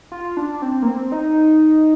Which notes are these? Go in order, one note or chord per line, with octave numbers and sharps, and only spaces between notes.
F4
D4
C4
A#3
C4
D#4